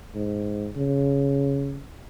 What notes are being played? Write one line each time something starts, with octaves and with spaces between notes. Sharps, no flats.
G#2
C#3